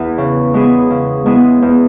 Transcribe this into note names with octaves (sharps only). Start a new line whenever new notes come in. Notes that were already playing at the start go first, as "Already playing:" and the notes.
Already playing: E2 E3 B3 E4 B4
C#3
G#3 B3 E4 G#4
C#3
G#3 B3 E4 G#4
E2